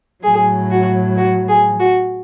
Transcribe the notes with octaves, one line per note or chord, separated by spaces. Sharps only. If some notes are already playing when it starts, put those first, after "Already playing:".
A2 F#3 G#4
F#4
F#4
G#4
F#4